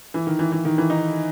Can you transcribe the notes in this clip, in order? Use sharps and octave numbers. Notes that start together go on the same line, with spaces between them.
E3
D#3
E3
E3
D#3
E3
D#4